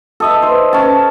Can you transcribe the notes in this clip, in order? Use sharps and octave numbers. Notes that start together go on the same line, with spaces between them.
A4 D#5 E5
C5
C#4 A5